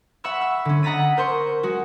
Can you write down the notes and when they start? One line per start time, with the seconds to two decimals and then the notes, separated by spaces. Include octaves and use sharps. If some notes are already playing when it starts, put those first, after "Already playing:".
0.24 E5 F#5 B5 C#6 E6
0.41 E6
0.65 D3 C#4
0.83 D#5 F#5 A#5 A6 B6 D#7
1.17 A#4 C5 C6 C#6
1.63 G#3 F#4